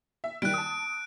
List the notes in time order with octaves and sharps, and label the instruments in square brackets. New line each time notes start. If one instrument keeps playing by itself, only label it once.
[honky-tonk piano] E5
[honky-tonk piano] D#3 G3 [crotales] F#6 D7
[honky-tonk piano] A5 D#6